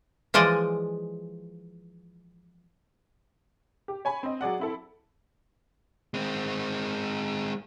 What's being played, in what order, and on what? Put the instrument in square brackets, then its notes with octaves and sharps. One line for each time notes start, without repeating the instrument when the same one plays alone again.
[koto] E3 F3 G#3 D5 D#5
[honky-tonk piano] G4
C#5 G#5 B5
C4 D#5
F#3 G#4 D5 F#5
C4 E4 A4
[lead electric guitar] G#3 C4